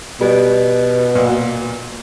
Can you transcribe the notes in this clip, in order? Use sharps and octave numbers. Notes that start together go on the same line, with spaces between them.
B2 G3
A#2